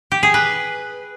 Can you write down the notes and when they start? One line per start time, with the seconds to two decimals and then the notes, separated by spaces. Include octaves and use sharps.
0.12 G4
0.23 G#4
0.34 B4